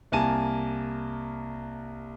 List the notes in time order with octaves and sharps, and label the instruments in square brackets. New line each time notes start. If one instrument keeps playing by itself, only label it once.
[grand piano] C2 A#3 G#5 A5 D#7